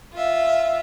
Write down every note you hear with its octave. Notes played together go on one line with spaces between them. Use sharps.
F4 E5